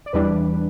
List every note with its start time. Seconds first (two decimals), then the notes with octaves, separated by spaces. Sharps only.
0.06 D5
0.13 E2 E3 G3 D4 B4